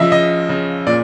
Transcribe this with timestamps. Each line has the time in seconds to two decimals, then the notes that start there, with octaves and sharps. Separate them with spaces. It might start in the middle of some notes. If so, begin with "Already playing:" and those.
Already playing: C#3 F3 D#5 E5
0.12 C#3 D#5
0.49 C#3
0.87 A#2 D5